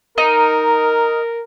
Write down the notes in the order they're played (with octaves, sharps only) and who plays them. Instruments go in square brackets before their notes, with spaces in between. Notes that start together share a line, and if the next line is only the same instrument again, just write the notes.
[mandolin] D#4 [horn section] A#4